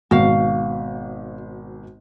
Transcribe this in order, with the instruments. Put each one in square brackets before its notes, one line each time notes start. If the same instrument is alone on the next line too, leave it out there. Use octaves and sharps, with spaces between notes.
[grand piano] G#1 G#2 B2 [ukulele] F#4 F5